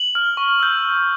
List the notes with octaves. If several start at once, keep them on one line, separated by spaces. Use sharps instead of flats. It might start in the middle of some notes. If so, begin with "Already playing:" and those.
Already playing: F#7
F6
C#6
E6 G6